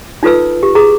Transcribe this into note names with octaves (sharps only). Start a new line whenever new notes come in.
D#4 F4 A4 B4 E6
G4
G#4 A#5